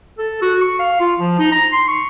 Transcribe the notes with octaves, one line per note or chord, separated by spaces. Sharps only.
A4
F#4
C#6
F5
F4
F3
D#4
A#5
C6
C#6